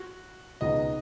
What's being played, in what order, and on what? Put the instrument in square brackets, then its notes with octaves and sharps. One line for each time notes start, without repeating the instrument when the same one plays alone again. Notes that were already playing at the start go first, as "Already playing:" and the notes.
Already playing: [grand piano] F#4
[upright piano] C#2 B2 B3 D#4 [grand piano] D#5